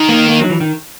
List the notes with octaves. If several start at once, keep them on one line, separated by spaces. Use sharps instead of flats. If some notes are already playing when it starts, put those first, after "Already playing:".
Already playing: D#3
A#3
A#3
F#3
E3
D#3